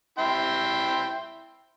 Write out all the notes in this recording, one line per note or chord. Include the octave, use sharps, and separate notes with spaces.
E4 G5 C6